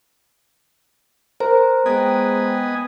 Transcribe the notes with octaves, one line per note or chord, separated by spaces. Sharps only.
A#4 C5 A#5
G#3 B3 D#5 G5 G#5